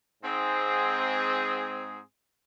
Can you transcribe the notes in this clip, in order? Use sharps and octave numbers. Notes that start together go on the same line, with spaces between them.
G#2 C4 G#4